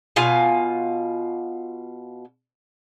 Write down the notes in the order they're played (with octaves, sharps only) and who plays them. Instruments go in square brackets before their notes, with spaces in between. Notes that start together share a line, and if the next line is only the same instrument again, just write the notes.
[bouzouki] B2 F4 F5 G#5